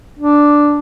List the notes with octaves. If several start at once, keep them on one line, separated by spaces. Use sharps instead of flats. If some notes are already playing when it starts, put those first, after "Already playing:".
D4